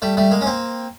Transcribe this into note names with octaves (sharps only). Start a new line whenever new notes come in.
G3 A3
G3 A3
G#3 A#3
C#4
A#3 C4